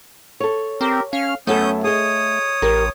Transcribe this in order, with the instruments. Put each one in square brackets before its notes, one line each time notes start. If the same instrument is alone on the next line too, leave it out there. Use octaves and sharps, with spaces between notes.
[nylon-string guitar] A4 C#5
[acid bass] C4 [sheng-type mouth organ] G4 A#4
[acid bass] C#4 [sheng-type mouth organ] F5 F6
[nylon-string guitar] F#2 B3 A4 [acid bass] A3 [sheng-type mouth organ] C#4 D#6 G6
[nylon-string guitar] G#4 D#5 [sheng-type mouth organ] C#5 D#6
[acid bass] A1 [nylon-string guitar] G4 A#4